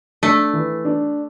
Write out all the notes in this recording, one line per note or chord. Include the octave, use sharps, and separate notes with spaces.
A3 D4
E3
D4